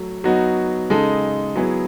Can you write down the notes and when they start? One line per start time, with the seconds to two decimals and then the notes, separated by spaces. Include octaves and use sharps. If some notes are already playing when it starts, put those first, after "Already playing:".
Already playing: F#3 A3
0.24 F#3 B3 D#4 F#4
0.90 C#3 G#3 D#4 A4
1.56 F#3 B3 E4 G#4